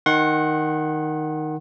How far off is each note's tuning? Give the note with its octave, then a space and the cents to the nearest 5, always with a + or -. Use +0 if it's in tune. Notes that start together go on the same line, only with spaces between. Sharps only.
D#3 +0 F#5 +0 C6 +45